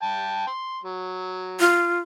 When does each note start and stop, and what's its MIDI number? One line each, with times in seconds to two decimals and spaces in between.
0.03 0.47 79
0.03 0.47 81
0.47 0.79 84
0.84 1.79 54
1.60 1.99 65